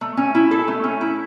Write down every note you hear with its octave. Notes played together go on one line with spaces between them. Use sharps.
A3
C#4
E4
A4
A3
C#4
E4